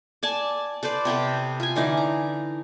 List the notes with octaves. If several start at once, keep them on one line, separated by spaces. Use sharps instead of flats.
D5 G#5 A5
A4 B4 C5 D5
C3 B3 G4 A4
F4 G#5
D3 E3 D#4 D5
A#5